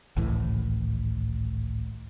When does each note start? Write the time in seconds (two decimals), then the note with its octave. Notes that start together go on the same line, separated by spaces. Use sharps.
0.17 G#1 C#2 A2 E3